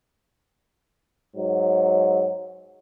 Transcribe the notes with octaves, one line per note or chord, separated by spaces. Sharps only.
G#2 F#3